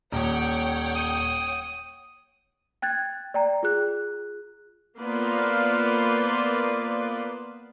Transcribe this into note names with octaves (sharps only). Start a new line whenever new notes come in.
D#1 C#5 F#5 G5
D#6
G5 F#6 G#6 A6
D5 G5 A#5
F4 G#4 F#6
A#3 B3 F4 B4 C5 D5